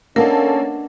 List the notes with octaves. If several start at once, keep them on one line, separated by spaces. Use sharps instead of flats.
A#3 B3 C#4 D4 A4 A#4 D#5